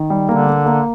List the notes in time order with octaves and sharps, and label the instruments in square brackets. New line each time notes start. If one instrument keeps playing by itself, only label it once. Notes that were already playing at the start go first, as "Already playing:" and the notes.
Already playing: [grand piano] D#3
G3
[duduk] D3 [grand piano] A#3
[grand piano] A#3
A#3